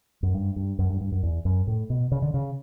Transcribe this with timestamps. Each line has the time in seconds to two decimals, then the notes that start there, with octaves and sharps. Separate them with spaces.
0.23 F#2
0.34 G2
0.56 G2
0.79 F#2
0.90 G2
1.01 G2
1.12 F#2
1.23 E2
1.45 F#2
1.67 A2
1.90 B2
2.12 C#3
2.22 D3
2.34 C#3